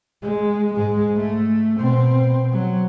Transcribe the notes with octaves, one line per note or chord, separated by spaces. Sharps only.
G#3
G#2 G#3
A3
B2 C4
F#3